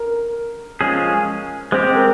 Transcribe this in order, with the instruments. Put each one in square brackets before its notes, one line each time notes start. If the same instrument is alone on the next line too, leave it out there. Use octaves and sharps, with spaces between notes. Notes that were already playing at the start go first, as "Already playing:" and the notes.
Already playing: [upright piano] A#4
[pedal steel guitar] F3 G#3 C#4 G#4
[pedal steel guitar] G#3 C4 G4 [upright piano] C5
[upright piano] A#4